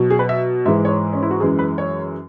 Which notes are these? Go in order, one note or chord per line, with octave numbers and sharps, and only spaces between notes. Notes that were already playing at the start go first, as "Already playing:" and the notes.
Already playing: B2 F#3
G#4
B4
E5
G#2 E3 G#3 E5
C#5
C#4
E4
F#4
F#2 E3 G#3 G#4
B4
C#5